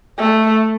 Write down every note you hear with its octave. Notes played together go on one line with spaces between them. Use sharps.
A3